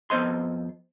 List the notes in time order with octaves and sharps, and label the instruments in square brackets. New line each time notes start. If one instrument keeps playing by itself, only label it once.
[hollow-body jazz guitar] F2 B3 C5 D#5 C6